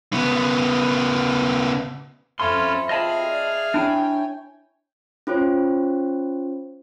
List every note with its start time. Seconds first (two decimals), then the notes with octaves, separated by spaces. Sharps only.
0.13 C#3 B3
2.40 F2 C#4 F4 A4 C5 E5 B5 C6
2.89 C4 F4 G#4 D#5 F5 A5 B5
3.24 D5
3.74 D4 E4 C#5 G5 G#5
5.27 C#4 F4 C5 C#5